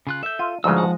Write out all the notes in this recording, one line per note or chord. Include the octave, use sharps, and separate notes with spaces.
C#3 F4 F#6
A4 E5 G6
F4 D#7
D2 G#2 C#3 F3 G#3 D#4 B4 E6
F5 F#5 A5